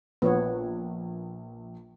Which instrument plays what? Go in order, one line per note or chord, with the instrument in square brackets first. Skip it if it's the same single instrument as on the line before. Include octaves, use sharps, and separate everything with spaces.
[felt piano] A#1 [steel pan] B3 C#5